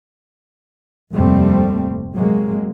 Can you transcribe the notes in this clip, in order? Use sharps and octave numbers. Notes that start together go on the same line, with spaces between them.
F1 D#2 G#2 G3 A3 C4
C3 F#3 G#3 A#3